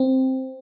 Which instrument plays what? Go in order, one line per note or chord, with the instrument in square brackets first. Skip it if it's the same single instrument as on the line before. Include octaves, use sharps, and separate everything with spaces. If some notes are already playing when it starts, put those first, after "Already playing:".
Already playing: [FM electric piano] C4